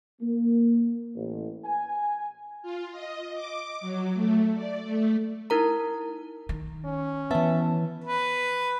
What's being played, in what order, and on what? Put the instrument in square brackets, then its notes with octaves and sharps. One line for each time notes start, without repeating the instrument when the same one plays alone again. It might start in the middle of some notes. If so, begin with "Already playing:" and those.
[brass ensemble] A#3
A1
G#5
[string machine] F4
D#5
D6
F#3
A3
D5
A3
[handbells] D#4 E4 A#4 A#5
[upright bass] D#3
[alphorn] C#4
[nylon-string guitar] E3 E5 [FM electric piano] B3 A5
[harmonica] B4